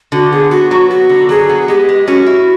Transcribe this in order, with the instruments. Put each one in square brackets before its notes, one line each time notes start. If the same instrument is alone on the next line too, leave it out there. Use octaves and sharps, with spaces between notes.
[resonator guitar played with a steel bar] D3 [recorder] F#4
[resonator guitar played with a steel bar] B3 [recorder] G#4
[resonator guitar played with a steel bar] B3 [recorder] F#4
[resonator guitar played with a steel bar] F#3 [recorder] F#4
[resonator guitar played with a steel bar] B3 [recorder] F#4
[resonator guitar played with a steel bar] D3
[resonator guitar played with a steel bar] F#3 [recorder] G#4
[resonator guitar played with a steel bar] B3
[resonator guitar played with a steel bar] G#3 [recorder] G4
[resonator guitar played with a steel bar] G#3
[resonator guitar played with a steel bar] C#4 [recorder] F#4
[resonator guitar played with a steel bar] E4